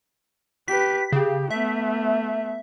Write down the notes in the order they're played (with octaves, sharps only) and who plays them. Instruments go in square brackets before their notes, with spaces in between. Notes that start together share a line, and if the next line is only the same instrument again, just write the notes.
[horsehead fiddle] G4 B4 [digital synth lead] B6
[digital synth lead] C#3 [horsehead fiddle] G4
[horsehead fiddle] A3 B3 [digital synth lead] E5